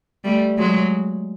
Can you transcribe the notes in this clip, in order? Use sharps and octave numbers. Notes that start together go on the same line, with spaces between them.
G3 A3
F#3 G#3